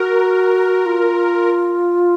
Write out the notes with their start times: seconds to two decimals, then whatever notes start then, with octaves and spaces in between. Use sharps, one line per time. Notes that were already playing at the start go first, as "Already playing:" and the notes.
Already playing: F#4 A#4
0.86 F4